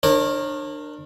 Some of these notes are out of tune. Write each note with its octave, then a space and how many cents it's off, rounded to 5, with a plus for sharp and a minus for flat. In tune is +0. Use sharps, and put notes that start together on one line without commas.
D4 +25 A#4 +0 C#5 -35